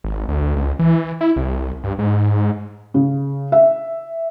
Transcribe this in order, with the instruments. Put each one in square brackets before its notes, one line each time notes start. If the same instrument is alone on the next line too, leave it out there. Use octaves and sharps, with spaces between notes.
[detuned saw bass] G#1
D2
C#2
E3
E4
C2
G2
G#2
[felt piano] C#3
E5